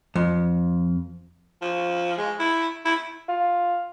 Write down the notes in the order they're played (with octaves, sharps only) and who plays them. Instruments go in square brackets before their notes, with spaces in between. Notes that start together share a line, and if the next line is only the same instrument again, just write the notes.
[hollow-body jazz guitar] F2
[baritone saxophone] F3
G#3
E4
E4
[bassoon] F4